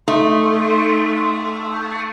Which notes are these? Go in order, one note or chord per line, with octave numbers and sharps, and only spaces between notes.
A3 D#4 C6